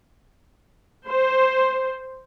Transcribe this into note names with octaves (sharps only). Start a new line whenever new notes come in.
C5